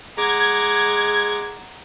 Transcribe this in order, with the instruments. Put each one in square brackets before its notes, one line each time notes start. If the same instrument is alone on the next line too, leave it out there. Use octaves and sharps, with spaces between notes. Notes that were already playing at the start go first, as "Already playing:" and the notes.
[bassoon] G#3 [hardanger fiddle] F#5 A#5 [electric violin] D6 [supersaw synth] G#6